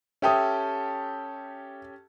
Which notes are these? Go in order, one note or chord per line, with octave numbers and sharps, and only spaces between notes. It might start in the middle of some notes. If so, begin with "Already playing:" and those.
C#4 G4 A4 E5 G5 D#6